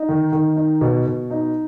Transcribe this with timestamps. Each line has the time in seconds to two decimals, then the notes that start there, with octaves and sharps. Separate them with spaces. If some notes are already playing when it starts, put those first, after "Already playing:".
Already playing: D#4
0.09 D#3
0.32 D#3
0.56 D#4
0.81 B2
1.06 B2
1.30 D#4